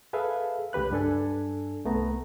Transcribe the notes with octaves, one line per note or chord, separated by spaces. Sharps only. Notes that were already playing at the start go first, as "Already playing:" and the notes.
G#4 A4 B4 E5 F5
C#2 C#3 G4 B4 F#6
G2 D4 A4 G#5
C2 A3 B3 A#5